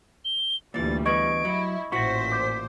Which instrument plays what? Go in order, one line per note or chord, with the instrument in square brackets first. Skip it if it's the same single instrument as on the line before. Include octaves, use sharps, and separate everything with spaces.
[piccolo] G7
[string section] D2 G3 [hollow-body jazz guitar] A#2 E3 [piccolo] A6
[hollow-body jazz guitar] E3 B3 [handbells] D#5 C#6 G#6 [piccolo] D7
[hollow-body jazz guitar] F#3 [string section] E4
[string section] A1 A#2 C5 [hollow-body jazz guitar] E4 F#4 [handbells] C#6 A#6 [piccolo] B6
[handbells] D6 G6